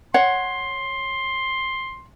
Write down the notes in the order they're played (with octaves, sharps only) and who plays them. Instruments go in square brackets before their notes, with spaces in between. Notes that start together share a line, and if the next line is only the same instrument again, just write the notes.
[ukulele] C#5 F#5 [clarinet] C6